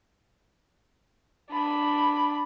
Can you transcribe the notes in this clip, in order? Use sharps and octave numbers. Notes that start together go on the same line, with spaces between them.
D4 B5